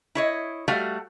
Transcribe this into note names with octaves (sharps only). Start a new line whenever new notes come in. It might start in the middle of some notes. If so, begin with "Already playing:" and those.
E4 C#5 D#5
G3 A3 F#4 F5